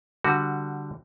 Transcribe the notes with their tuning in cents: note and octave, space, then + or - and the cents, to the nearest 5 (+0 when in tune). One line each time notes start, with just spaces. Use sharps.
D3 +0 G3 +0 F#4 +0